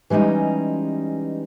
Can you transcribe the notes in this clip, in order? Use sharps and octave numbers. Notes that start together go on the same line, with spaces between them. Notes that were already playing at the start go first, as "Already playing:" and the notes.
E3 G3 G#3 C#4 D#4